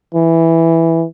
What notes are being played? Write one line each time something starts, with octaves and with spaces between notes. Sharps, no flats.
E3